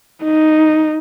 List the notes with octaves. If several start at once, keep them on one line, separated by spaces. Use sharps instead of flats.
D#4